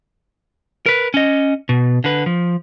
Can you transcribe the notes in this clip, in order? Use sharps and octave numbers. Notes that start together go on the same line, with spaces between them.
A#4 B4
C#4 D#5
B2
D3 B4
F3